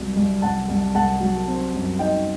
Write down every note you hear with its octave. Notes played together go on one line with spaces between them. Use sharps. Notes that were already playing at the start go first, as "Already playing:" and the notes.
Already playing: C2 C3 F#3
C2
C2 F#5 A5
C2
C2 F#5 A5
F#3
C4
F#2
D#4 D#5 G5